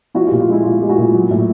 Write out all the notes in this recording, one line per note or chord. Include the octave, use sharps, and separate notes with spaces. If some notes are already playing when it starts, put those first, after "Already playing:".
F3 E4 F#4
F4 G4
A#2
F4
G#3 E4
A#2 F4
G#3 G4
E4 F#4
A#2
F#3
A2